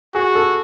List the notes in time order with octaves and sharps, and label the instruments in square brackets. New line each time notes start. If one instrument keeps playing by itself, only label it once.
[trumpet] F#4 [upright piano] G#4
[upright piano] A4